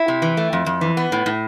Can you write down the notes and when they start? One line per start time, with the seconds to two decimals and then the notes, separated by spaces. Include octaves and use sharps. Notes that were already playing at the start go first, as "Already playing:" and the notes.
Already playing: E4
0.08 C3
0.22 E3
0.37 A3
0.53 F2
0.66 F2
0.81 E3
0.97 B3
1.12 A2
1.26 A2